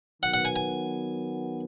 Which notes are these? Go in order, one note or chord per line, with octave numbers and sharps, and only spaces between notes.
D#3 F#3 B3 F#5
F#5
G#5
G#5